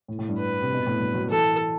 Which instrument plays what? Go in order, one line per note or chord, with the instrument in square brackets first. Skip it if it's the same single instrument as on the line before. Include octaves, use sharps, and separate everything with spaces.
[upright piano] A2
A2
G2
[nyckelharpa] B4
[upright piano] C3
B2
A2
G2
F#3
[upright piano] E3 [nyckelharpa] A4